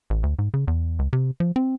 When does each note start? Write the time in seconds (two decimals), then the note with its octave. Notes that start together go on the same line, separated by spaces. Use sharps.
0.10 A1
0.23 D2
0.39 G#2
0.54 C#3
0.68 E2
0.99 C#2
1.13 C3
1.40 F3
1.56 C4